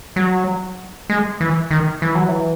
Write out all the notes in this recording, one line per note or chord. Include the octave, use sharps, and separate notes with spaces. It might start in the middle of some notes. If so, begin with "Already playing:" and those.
F#3
G#3
E3
D#3
E3
F#3
E3